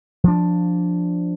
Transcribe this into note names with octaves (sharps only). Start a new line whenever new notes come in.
F3 D4